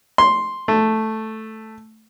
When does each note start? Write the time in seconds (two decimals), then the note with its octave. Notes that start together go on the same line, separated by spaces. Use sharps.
0.18 C6
0.68 A3